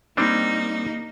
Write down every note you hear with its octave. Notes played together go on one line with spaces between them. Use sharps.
G3 A#3 C4 D4 D#4